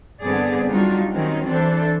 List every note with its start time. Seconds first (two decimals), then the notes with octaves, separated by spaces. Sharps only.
0.21 G2 D3 B3 C4 G#4 D5
0.68 F#3 G3 D4 D#4 F4 F#4
1.12 D#3 F#3 C4 C#4 D#4
1.47 E3 D4 A4 C5